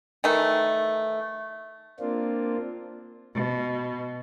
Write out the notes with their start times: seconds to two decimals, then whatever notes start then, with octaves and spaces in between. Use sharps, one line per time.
0.24 D#3 E3 A3
2.00 A#3 C4 D4 F4
3.35 B2